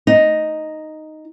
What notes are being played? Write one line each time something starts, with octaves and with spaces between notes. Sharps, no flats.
D#4